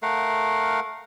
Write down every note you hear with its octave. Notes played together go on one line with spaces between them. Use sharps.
A3 A#4 F5 F#5